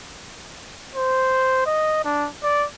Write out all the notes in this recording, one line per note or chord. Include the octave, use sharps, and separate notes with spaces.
C5
D#5
D4
D5